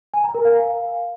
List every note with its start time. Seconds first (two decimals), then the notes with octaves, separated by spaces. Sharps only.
0.14 G#5
0.24 A#5
0.35 A#4
0.45 F5